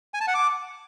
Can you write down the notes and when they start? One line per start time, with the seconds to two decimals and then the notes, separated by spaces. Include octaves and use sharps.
0.14 G#5
0.21 A5
0.28 F#5
0.34 D6